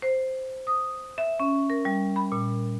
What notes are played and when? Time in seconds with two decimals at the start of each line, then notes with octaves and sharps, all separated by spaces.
0.02 C5
0.67 D#6
1.18 E5
1.40 C#4
1.70 A#4
1.85 G3
2.16 B5
2.32 A#2